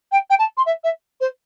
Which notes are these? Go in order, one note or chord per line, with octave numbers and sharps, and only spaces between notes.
G5
G5
A5
C6
E5
E5
C5